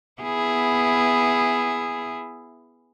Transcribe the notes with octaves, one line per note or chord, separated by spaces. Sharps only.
B3 E4 G#4